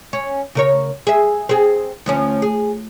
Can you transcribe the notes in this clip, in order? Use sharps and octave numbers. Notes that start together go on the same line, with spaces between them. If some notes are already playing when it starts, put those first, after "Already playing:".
C#4
C#3 A#4 C#5
G#4 E5
C4 G#4
D2 F3 C#4
G#4